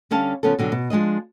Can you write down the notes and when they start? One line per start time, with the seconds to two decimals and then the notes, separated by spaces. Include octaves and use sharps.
0.11 D3 G3 C#4 F5 A5
0.43 C#3 F3 B3 C#4 A4
0.59 B2 D3 F#3 G3
0.72 B2
0.90 F3 G#3 D4 D#5